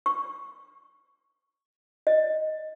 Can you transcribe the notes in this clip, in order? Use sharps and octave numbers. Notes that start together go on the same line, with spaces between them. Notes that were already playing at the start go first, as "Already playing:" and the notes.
C#6
D#5